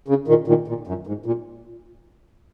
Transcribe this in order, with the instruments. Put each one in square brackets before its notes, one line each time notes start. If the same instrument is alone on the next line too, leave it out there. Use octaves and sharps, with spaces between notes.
[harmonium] C#3
A#2 D#3
A#2 D#3
A#2
F#2
G#2
A#2